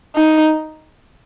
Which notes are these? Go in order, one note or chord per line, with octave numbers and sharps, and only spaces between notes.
D#4